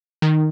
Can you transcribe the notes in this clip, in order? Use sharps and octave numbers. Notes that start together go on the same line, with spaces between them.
D#3